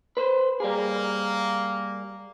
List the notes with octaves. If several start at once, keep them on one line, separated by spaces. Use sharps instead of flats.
B4 C5
G3 A#3 G#4